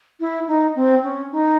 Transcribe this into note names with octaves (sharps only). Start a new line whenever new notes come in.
E4
D#4
C4
C#4
D#4